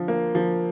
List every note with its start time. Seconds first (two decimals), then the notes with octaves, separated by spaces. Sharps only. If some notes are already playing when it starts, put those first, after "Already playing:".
Already playing: D3 F3
0.08 A#3
0.35 F3